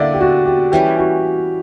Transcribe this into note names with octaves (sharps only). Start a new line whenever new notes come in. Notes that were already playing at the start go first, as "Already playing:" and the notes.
Already playing: D3 A#3 E4 D5 E5 F#5
G4
F#4
G4
E3 G3 C#4 G4
F#4